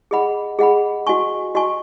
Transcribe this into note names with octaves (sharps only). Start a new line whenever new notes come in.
G#4 D#5 F#5 B5
G#4 D#5 F#5 B5
F#4 D#5 G#5 C#6
F#4 D#5 G#5 C#6